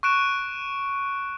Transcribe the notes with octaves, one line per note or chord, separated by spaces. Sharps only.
C#6 F#6 D7 E7